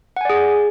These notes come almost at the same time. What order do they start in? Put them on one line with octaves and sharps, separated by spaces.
F#5 G#5 D5 G#4